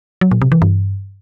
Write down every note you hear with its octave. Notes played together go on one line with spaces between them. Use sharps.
F#3
A#2
C3
E3
G2